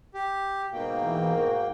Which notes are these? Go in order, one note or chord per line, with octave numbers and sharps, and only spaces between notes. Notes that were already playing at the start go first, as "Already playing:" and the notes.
G4
G#2 B2 A#3 G5
E3
F#4 A#4